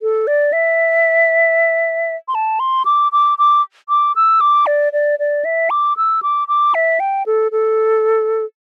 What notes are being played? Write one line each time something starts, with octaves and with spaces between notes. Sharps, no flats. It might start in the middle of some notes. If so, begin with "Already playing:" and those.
A4
D5
E5
C6
A5
C6
D6
D6
D6
D6
E6
D6
D5
D5
D5
E5
D6
E6
D6
D6
E5
G5
A4
A4